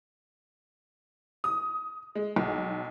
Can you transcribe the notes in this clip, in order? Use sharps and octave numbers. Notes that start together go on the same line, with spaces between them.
D#6
G#3
B1